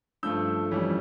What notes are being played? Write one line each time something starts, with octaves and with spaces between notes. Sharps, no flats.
G2 F3 A3 E6 G6
F2 E3 G3 C#4